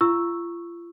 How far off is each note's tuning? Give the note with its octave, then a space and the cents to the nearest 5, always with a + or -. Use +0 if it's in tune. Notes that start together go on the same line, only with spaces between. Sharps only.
F4 -35 C#6 -5 E6 +0